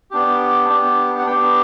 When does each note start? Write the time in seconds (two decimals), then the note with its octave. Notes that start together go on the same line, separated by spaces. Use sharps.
0.11 B3 D4 G4
0.69 B3 D4 G4
1.18 F#5
1.27 B3 D4 G4 G5